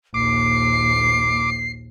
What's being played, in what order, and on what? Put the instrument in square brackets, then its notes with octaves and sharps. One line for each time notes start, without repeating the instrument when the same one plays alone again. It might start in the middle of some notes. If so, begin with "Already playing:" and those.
[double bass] A#1 D#2 [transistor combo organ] D6 [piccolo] C7